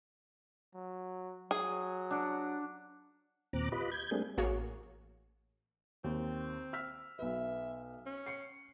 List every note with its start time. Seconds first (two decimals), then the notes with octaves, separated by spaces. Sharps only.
0.74 F#3
1.51 F#3 G#4
2.11 D4 F#5
3.53 D#2 A#2 C4 A#5 D6 F#6
3.72 F4 G4 B4 D#5 B5
3.91 G6 G#6
4.11 G3 A3 A#3 C4 D4 G#4
4.38 A1 A#3 F#4 G#4 C#5
6.04 D#2 C4
6.73 E6 F6 B6
7.19 B1 B4 E5
8.06 C#4
8.26 C7 C#7